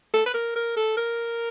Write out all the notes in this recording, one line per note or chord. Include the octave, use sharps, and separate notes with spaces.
A4
B4
A#4
A#4
A4
A#4